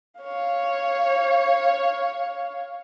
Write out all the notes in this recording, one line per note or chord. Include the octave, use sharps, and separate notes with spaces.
C#5 F5